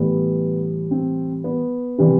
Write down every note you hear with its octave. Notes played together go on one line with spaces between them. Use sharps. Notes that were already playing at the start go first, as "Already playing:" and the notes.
Already playing: A2 E3 G3 B3
C4
B3
C3 E3 G3